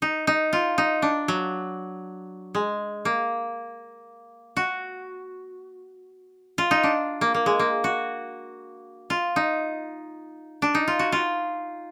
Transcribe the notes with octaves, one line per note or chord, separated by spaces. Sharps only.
D#4
D#4
F4
D#4
D4
F#3
G#3
A#3
F#4
F4
D#4
D4
A#3
A#3
G#3
A#3
F#4
F4
D#4
D4
D#4
F4
F#4
F4